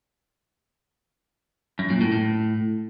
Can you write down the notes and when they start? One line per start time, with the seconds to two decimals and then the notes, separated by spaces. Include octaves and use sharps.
1.79 F#2
1.90 A#2
2.01 A2
2.12 A2